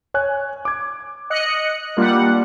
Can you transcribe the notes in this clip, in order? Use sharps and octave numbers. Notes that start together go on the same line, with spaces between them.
C#5 G#5 F#6
D6 G#6
D#5 F#6 C#7
G3 A#3 D4 F4 F#5